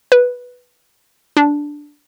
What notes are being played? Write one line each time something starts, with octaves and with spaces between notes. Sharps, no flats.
B4
D4